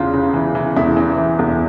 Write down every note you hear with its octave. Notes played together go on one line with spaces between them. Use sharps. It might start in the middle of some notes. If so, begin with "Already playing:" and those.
Already playing: E2 C#3 F4
C#3
E3
E3
E2 E4
E3
E3
E2